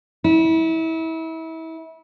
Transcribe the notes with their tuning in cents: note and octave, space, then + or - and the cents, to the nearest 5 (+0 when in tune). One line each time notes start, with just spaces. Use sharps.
E4 -30